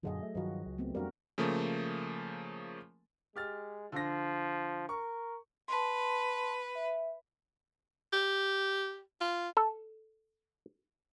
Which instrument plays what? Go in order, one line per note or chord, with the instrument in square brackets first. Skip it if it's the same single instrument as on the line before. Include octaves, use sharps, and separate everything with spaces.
[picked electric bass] F#2 A#2 D3 [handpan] F#3 G#4 D#5
[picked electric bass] A3
[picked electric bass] G2 D#3 F3 [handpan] F#3 F#4
[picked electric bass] C#2
[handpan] A3 B3 C4
[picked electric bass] F2 G3 [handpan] D4 F#4 A#4
[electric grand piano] C#3 F3 A3 A#3
[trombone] G#3 [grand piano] G4 F6 A6
[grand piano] D3 A#6 [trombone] F3
[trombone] A#4 [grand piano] C#6
[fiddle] B4 [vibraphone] A5 C6
[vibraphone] E5
[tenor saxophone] G4
F4
[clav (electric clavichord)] A4